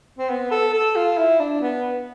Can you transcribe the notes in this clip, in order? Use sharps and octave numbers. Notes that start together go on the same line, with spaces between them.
C4
B3
A4
A4
F4
E4
D4
B3